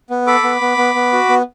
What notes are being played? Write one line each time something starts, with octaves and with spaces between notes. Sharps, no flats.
B3
A4 B5 D6
B3
B3
B3
B3
F#4
B3